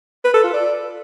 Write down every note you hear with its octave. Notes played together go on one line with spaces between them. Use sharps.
B4
A4
F4
D5